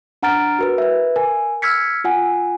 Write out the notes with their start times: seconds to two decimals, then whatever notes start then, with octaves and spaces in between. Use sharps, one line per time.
0.23 D4 F#5 A#5 F6 A6 D7
0.59 F#4 A#4 B4
0.78 B4 E5
1.16 A#4 G#5
1.62 E6 F6 G#6 B6 C#7
2.04 F4 F#5 G#5